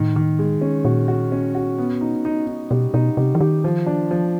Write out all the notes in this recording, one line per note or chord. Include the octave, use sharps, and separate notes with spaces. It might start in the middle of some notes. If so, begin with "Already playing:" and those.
Already playing: A2 D#3
D#3
G#3
C#4
A#2 F#4
F#4
C#4
F#4
B3
D#4
D#4
D#4
B2 G3
B2 D#4
C3 G3
E3
D#3 G4
F3
D4
F3